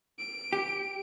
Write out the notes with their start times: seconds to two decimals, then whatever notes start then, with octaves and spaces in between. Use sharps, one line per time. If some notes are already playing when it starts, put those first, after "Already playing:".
0.19 D7
0.53 G4